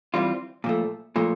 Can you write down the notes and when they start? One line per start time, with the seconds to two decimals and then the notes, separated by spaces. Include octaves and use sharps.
0.14 E3 G3 C4 F4
0.64 A#2 F3 A3
1.16 A#2 F3 A3